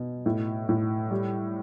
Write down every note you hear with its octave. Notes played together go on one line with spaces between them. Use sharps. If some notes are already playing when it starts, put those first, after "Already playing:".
Already playing: B2
A2
A2
G3